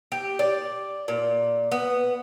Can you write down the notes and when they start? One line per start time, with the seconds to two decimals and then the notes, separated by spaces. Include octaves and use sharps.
0.12 G4
0.39 D5
1.08 A#2
1.72 B3